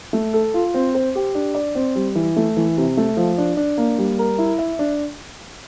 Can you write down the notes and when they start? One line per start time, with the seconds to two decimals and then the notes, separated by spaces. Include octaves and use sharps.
0.13 A3
0.34 A4
0.54 F4
0.74 C4
0.95 C5
1.15 G4
1.35 D4
1.55 D5
1.75 C4
1.95 G3
2.15 E3
2.37 A3
2.57 E3
2.77 C3
2.97 A3
3.17 F3
3.38 D4
3.57 D4
3.78 A#3
3.98 G3
4.19 A#4
4.38 E4
4.58 E5
4.79 D4